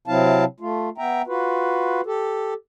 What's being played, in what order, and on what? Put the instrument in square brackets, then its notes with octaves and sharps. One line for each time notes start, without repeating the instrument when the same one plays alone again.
[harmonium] C3 F#3 C4 E4 F5 A5
A3 F4
B3 E5 G5 A#5
F4 F#4 B4
G4 A4